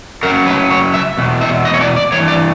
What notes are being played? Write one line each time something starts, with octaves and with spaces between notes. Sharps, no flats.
F#2 C#3 F#3 A#4
B4
C#5
E5
E2 B2
E5
D#5
C#5
D5
D5
G2 E3 C#5
D5